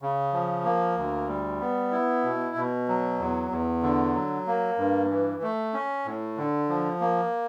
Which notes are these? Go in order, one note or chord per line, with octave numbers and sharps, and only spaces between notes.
C#3
F3
A#3
D2
G3
B3
E4
B2
B2
F#3
E2
E2
D3
F#3
A#3
G2
E3
A3
C#4
A2
D3
F3
A#3